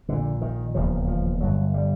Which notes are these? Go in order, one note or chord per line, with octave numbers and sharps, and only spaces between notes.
A#1 A#2 D3
D#3
E1 D#2 C#3 F3
F3
G1 G2 D3 F#3
G3